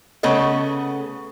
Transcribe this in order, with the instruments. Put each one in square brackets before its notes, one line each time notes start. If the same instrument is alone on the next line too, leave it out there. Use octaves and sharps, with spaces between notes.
[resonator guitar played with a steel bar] C#3 A3 B3 A4 D#5